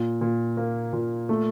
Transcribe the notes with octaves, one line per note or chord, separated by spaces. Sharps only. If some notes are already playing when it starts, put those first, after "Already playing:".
Already playing: A#2
A#2
A#3
A#2
A3